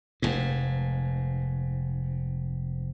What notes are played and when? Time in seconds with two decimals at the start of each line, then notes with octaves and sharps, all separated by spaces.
0.22 F1 G#2